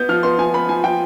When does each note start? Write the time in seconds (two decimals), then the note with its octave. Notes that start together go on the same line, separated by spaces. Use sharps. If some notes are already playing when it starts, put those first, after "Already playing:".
Already playing: B3 G6
0.09 F3 F6
0.23 B3 C6
0.38 F3 G#5
0.54 B3 B5
0.69 F3 G#5
0.84 F3 G5